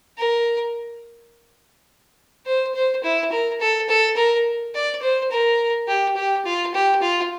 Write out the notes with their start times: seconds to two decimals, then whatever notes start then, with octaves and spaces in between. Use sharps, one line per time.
0.18 A#4
2.46 C5
2.75 C5
3.03 E4
3.32 A#4
3.60 A4
3.89 A4
4.17 A#4
4.75 D5
5.02 C5
5.31 A#4
5.88 G4
6.16 G4
6.45 F4
6.74 G4
7.02 F4